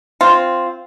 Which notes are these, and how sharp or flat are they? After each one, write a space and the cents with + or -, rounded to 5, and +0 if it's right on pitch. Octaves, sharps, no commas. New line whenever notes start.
C4 +0 F4 +0